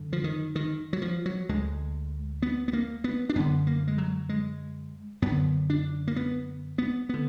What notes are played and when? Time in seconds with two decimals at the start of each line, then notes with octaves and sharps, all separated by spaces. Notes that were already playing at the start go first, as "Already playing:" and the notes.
Already playing: F#2 D3
0.13 F3
0.24 D#3
0.56 D#3
0.93 F#3
1.02 F3
1.26 F#3
1.49 D2 D3 G#3
2.42 B3
2.68 B3
2.73 A#3
3.04 B3
3.29 D4
3.35 F#2 D3 B3
3.67 A#3
3.88 G#3
3.98 F#3
4.29 G#3
5.22 F#2 D3 B3
5.70 D4
6.08 A#3
6.16 B3
6.78 B3
7.09 D3 B3